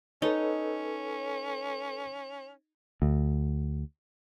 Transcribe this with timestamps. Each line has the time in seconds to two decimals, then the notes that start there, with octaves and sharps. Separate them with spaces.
0.22 C#4 D#4 A4 B4 C#5
3.02 D2